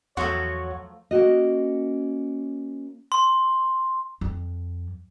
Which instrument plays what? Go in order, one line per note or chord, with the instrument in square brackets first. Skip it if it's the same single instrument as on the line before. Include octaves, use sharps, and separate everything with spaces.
[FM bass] E2 [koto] F3 F#3 A3 [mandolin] F#4 [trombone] C#5
[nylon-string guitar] A#3 C#4 F#4 D#5
[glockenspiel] C6
[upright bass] F2